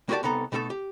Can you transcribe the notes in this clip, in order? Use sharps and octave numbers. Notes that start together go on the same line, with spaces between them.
A#3 F#4 G4 B4 D5 A5
C2 B3 D#4 A4 A#5
B2 A3 D#4 F#4 A4 A5
G4